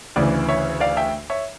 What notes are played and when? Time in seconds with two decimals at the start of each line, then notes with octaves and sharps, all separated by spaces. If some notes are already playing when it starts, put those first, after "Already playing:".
0.16 D2 C#3 E3 D5
0.48 C#5 E5
0.80 D5 F5
0.97 E5 G5
1.30 C#5 E5